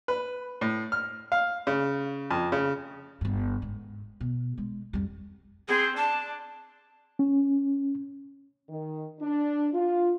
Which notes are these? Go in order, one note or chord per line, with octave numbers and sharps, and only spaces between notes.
B4
A2
F6
F5
C#3
F2
C#3
G1 G2
G#2
B2
G#3
F2 G3
C4 G#4
D4 A5
C#4
D#3
D4
F4